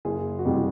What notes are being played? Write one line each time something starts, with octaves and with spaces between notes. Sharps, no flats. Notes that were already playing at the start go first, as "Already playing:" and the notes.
F#1 G#4
F#4
F2 C3 E3 G3 G4